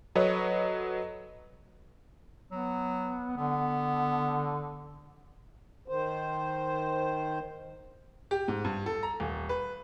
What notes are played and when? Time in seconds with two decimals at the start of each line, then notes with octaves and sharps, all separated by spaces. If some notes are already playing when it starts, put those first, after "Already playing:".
0.15 F#3 A4 B4 C#5 D#5
2.52 F#3 B3
3.37 D3 B3
5.88 D#3 C5
8.31 G4
8.48 G#2
8.65 G2
8.86 A4
9.03 A#5
9.20 D#1
9.49 B4